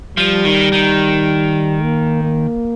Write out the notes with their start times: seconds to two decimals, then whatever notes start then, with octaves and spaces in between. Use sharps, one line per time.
0.17 F3 G3
0.45 D#3
0.72 D#3
1.83 A#3
2.23 A#3